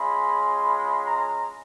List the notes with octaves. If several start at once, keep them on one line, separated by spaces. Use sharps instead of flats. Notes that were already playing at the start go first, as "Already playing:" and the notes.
Already playing: G#3 C#4 F4 B5
B5
A#5